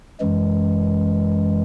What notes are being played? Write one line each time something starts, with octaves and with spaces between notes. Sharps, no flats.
F#2 E3 G#3